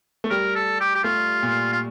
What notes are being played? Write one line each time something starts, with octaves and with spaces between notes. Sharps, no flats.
A3
G3 A#4
A4
G4
G4
A3 F4
A#2
F4